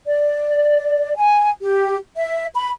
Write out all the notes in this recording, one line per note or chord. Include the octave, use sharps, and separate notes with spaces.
D5
G#5
G4
E5
B5